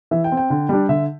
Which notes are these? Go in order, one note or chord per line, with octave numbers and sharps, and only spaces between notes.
E3 E5
G5
C4
G5
D3
G3 D4
D3 E5